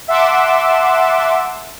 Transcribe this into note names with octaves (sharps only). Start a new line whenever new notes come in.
E5 F#5 A5 C6 D6 E7